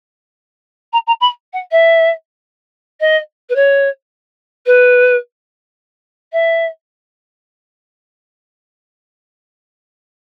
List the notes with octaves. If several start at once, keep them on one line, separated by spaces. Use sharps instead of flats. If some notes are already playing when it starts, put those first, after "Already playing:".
A#5
A#5
B5
F#5
E5
D#5
B4
C#5
B4
E5